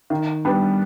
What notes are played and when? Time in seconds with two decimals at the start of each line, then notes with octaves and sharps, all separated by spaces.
0.10 D#3
0.45 G3 B3 D4